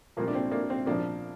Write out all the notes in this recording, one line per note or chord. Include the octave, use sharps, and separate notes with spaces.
C2 A#2 F3 A#3
D4
C4
A#3 D4
C4
A#1 A#2 F3 A#3 D4